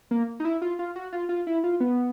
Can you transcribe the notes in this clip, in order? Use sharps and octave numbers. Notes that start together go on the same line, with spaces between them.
A#3
D#4
E4
F4
F4
F#4
F4
F4
E4
F4
B3